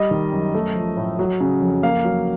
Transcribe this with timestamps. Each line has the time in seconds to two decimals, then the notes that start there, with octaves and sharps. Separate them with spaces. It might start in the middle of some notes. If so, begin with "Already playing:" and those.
Already playing: G3 D#5
0.11 D#3
0.32 F#2
0.54 A3
0.75 F3
0.97 A2
1.19 F#3
1.40 C#3
1.61 F2
1.83 A#3 F5
2.05 F#3